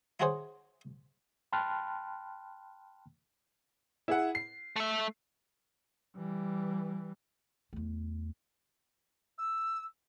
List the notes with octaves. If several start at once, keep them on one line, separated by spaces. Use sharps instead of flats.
D#4 E4 F#4 G#4 C5 C#5
G5 A5 B5 C6 F6 F#6
E4 G#4 F#5
C7
A3 E5
E3 G3
E2 A3
E6